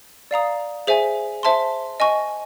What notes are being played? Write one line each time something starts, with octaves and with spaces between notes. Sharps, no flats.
D5 F5 A#5 D#6
G#4 C5 E5 G#5
C5 E5 A5 C6
D#5 G#5 C#6